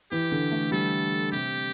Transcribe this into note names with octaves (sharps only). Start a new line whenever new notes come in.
E3 G4
D3
A3
G3 A4
C3 G4